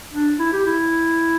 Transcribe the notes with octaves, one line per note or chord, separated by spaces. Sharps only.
D4
E4
G4
E4